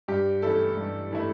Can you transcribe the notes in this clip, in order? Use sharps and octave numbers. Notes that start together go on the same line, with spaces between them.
G2 G4
E3 A3 E4 A4
G2
E3 A3 E4